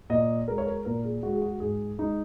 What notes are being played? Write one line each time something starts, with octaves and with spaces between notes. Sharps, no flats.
A#2 D#5
G#3 A#4
C#5
A#4
A#2 A#4
G#4
G#3 F#4
G#4
F#4
G#2 G#4
G#3 D#4